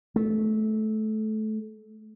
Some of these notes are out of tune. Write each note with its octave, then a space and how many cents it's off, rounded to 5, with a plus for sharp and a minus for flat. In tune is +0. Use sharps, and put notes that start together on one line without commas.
A3 -20